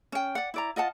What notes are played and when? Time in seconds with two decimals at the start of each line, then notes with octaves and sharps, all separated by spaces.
0.12 C#4 G5
0.35 D5 F#5
0.54 E4 D5 A#5
0.76 F4 D#5 F#5 A5